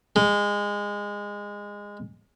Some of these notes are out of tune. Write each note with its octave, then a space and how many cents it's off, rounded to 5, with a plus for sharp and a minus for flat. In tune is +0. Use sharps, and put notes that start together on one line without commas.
G#3 -20